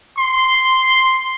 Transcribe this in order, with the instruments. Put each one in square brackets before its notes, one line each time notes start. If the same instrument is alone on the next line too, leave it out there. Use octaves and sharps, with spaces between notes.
[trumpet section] C6